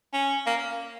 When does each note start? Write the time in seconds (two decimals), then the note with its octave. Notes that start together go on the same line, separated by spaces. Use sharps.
0.13 C#4
0.46 A#3